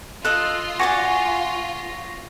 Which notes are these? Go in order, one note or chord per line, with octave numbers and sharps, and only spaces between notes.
F4 A4 D#5 F#6
F#4 D5 F#5 G#5 C#6 A#6